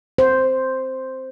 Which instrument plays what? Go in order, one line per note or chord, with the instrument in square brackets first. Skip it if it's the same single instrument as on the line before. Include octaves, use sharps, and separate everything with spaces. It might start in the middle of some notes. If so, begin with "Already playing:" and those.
[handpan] C5